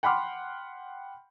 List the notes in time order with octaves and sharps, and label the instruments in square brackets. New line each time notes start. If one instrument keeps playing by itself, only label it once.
[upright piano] F#5 G5 B5 C6 D6 F6